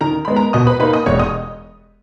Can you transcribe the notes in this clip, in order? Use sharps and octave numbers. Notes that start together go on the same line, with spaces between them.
D#3 A#4 A#5
G#3 B3 B5
A#4 A#5
B2 D#5 D#6
B4 B5
A#3 D#4 B4 B5
D#5 D#6
E1 C#5 C#6
D#5 D#6